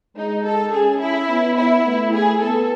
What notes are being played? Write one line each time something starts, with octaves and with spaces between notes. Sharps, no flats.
G#3 D#4
A4
C#4 G#4
E4
B3
E4
A3
G#4
B3 A4